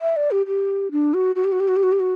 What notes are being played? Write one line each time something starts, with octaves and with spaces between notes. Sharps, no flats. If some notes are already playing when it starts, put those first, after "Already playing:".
E5
D5
G4
G4
D4
F#4
F#4
G4
F#4
G4
F#4
G4
F#4
G4
F#4